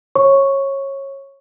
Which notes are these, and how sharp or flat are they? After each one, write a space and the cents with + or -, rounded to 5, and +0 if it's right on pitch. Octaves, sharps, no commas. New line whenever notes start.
C#5 -20 C#6 +0